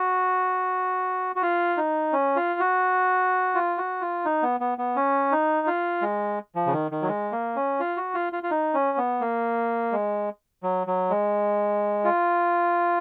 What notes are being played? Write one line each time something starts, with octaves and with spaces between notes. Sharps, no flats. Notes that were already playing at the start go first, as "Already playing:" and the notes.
Already playing: F#4
F#4
F4
D#4
C#4
F4
F#4
F4
F#4
F4
D#4
B3
B3
B3
C#4
D#4
F4
G#3
F3
C#3
D#3
D#3
F#3
G#3
A#3
C#4
F4
F#4
F4
F4
F4
D#4
C#4
B3
A#3
G#3
F#3
F#3
G#3
F4